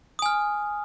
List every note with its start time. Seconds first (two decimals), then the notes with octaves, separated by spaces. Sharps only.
0.19 D#6
0.22 G#5
0.26 F6